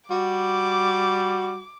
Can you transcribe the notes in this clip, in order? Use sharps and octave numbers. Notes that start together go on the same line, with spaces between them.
G3 F#4 D6